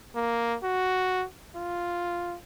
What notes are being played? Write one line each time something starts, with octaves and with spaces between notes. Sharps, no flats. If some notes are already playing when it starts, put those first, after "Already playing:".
A#3
F#4
F4